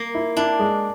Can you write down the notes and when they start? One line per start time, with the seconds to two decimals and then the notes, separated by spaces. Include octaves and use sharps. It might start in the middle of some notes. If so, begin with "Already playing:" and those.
Already playing: A#3
0.15 E4
0.37 D4 E4
0.59 G#3